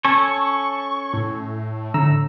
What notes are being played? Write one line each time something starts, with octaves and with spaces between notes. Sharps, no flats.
C#4 A4 C#5 C#6
A2
D3 A#5 E6